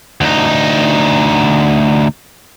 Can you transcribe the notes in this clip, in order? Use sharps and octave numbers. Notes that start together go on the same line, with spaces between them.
D2 D#4